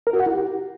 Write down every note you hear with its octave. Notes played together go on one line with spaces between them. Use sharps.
A#4
F#4
F#5
E4
G4